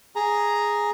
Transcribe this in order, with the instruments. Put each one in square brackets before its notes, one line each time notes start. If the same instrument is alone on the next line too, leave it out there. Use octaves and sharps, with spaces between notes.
[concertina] G#4 A#5